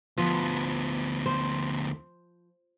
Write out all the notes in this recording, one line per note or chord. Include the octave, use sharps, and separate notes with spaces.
D2 F3 B3
C5